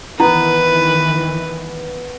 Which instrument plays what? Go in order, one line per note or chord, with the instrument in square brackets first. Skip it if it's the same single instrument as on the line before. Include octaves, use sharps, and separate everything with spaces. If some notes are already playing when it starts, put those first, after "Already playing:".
[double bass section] D#3 E3 [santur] B3 [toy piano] E4 [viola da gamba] B4